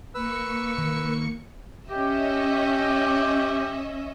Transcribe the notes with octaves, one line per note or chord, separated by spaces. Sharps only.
A#3 B4 C#6 E6 C#7
D#3
C#4 G4 D#5 E5